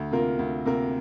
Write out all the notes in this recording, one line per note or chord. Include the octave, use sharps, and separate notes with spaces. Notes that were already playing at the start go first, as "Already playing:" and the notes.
Already playing: D2
C3 A#3 F4 A#4
D2
C3 A#3 F4 A#4